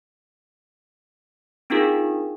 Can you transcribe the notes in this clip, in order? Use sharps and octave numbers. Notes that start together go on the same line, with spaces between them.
C4 D4 D#4 F4 G#4 A#4